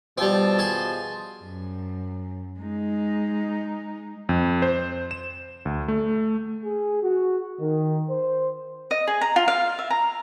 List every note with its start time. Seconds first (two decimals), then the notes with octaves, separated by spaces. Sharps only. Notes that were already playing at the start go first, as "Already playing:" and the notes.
0.18 B2 F3 G3 C4 A5
0.59 G#4 C6
1.42 F#2
2.59 G#3 D#4
4.29 F2
4.62 C5
5.11 E7
5.65 D2
5.88 A3
6.64 G#4
7.03 F#4
7.61 D#3
8.09 C5
8.91 D#5
9.08 G#4
9.21 A#5
9.36 F4
9.48 F5
9.79 E5
9.90 A#5